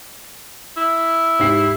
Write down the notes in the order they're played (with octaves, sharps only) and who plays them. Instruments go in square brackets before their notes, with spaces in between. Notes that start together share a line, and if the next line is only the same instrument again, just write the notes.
[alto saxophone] E4
[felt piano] G#2 G4 C7